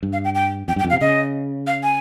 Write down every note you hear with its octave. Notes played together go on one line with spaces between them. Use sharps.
G2
F5
G5
G5
F2 G5
G2
G5
F2
C3 F5
C#3 D#5
F5
G#5